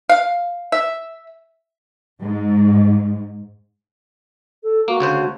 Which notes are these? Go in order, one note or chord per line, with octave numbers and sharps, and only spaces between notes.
F5
E5
G#2
A4
A#3 F#4
D2 C#3 C5